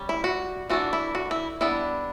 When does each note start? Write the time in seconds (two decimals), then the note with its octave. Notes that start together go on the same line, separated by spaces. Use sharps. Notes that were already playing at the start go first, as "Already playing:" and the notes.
Already playing: G3 C#4
0.09 E4
0.24 F#4
0.69 E3 A3 D4 F#4
0.93 E4
1.15 F#4
1.31 E4
1.61 G3 B3 D4 E4